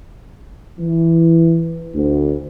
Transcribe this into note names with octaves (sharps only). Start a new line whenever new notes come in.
E3
D2